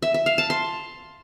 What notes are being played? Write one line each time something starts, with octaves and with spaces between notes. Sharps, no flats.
E5
E5
F5
A5
C6